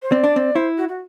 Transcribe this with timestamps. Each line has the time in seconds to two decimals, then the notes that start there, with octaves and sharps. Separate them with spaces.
0.02 C5
0.11 C4 D5
0.24 D4
0.36 C4
0.55 E4 C5
0.77 F#4
0.89 F#4